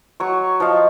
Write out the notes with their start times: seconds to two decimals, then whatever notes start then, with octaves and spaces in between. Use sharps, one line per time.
0.20 F#3 C#6
0.60 F3 D#5 F5